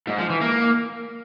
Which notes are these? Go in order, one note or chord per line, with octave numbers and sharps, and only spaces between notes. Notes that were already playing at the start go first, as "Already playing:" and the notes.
G#2
F3
E3
A#3